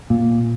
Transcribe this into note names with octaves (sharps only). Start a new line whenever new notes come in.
A#2